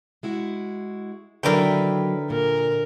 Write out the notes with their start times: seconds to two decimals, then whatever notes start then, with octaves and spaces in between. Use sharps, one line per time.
0.23 G#3 E4 F#4
1.43 D3 D#3 F#3 D4 E4 A#4 B4 G5
2.30 A#2 A#4